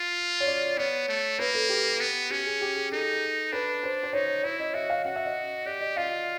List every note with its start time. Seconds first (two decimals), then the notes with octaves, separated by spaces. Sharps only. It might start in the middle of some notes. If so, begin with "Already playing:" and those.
Already playing: F4
0.40 C#5
0.47 D5
0.77 B3 C#5
1.08 A3
1.39 A#3 B4
1.54 A4
1.69 G4
2.00 B3
2.31 C#4 G4
2.46 G#4
2.61 G4
2.76 G#4
2.92 D#4 A4
3.52 D4 B4
3.83 C5
4.03 C5
4.13 D#4 C#5
4.44 E4 C#5
4.60 D#5
4.74 F#4 E5
4.90 F5
5.05 F#4 F#5
5.16 E5
5.26 D#5
5.66 G4 D5
5.81 D#5
5.97 F4 F5